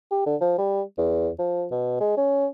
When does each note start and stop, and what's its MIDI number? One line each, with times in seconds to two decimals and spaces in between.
0.11 0.26 67
0.26 0.36 50
0.41 0.55 53
0.58 0.82 55
0.98 1.29 40
1.39 1.66 53
1.71 2.00 47
2.00 2.16 56
2.17 2.46 61